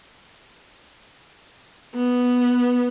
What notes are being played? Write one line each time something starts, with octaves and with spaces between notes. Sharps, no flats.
B3